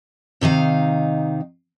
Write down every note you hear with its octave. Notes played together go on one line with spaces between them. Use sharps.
C3 D#3 D#4 F5